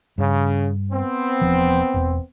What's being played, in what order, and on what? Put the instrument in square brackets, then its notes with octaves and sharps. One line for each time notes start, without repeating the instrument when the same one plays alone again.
[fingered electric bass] G2 [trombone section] C#3
[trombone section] B3 C4
[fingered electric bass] E1 F3
E1 E2